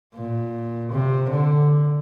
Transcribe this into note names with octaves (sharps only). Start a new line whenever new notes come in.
A#2
C3
D3